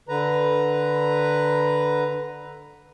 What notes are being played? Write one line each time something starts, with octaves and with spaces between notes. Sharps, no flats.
D3 B4 A#5